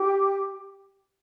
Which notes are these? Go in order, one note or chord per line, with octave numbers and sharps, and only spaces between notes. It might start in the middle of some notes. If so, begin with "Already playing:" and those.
Already playing: G4